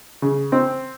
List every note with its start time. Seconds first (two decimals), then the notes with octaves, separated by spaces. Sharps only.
0.22 C#3
0.52 C4